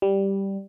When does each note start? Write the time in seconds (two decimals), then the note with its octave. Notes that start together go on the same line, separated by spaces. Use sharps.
0.02 G3